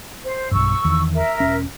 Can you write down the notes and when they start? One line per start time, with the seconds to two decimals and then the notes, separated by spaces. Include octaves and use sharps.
0.25 C5
0.51 B1 G2 C#6 E6
0.85 E2 D#3
1.14 A#4 E5
1.40 E1 C#4